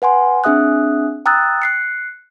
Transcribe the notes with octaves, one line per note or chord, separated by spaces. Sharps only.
B4 F#5 G#5 C6
C4 D4 G#4 E5 D#6 F#6
G5 A#5 D#6 E6 F#6 A6
F#6 C7 C#7